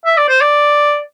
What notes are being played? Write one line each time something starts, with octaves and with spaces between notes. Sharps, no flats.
E5
D5
C5
D5